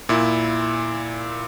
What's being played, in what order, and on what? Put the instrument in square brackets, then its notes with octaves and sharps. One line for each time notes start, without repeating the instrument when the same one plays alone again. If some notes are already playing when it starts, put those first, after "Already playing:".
[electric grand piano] A#2 E4